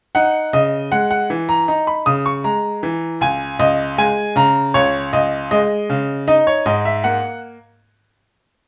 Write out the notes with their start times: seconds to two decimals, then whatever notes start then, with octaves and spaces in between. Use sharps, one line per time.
0.15 D#4 F#5
0.53 C#3 D#5
0.92 G#3 F#5
1.11 F#5
1.30 E3
1.49 A#5
1.68 D#4 A#5
1.87 B5
2.06 C#3 D#6
2.26 C#6
2.44 G#3 A#5
2.83 E3
3.21 C#2 G#5
3.59 C#2 D#5
3.98 G#3 G#5
4.36 C#3 A#5
4.74 C#2 C#5
5.13 C#2 D#5
5.51 G#3 D#5
5.90 C#3
6.28 D#4 D#5
6.47 C#5
6.66 G#2 D#5
6.85 E5
7.04 A#3 F#5